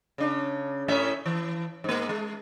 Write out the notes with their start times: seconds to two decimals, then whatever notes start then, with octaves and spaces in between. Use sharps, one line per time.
0.18 C#3 D4
0.88 A2 C#4 E5
1.26 E3
1.84 G#2 A#3
2.09 G#3